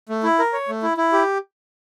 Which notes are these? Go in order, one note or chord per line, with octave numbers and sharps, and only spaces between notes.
A3
E4
A#4
C#5
A3
E4
E4
G4